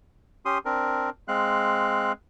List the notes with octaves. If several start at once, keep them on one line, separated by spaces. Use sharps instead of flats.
C#4 G4 C6 D#6
C4 D4 A#4
G#3 C4 F5 F#6